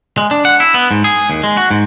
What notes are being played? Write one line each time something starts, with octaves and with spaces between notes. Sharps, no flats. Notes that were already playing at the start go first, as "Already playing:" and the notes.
G#3
D4
F#5
E4
B3
G#2
G#4
D#2
G#3
F#4
G#2